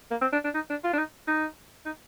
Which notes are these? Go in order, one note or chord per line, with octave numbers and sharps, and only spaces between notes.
A#3
C4
D4
D4
D#4
D4
F4
D4
D#4
D#4
D#4